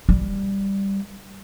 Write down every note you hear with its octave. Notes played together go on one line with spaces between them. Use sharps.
G3